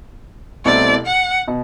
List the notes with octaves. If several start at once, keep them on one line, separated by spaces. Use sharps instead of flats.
C2 B2 A3 C4 E4 D5
F#5
B2